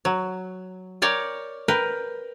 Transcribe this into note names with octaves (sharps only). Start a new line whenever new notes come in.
F#3
A#4 C#5 D5 G5
A#4 B4 G5